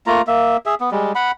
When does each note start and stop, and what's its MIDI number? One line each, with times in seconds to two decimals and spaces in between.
0.07 0.22 57
0.07 0.22 58
0.07 0.22 65
0.07 0.22 82
0.27 0.57 58
0.27 0.57 76
0.66 0.75 68
0.66 0.75 76
0.80 0.90 59
0.91 1.12 55
0.91 1.12 56
1.15 1.31 78
1.15 1.31 83